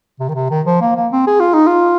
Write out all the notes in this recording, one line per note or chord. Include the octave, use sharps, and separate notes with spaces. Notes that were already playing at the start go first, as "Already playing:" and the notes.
C3
D#3
C3
D#3
F3
A#3
A#3
C4
G#4
F4
D#4
F4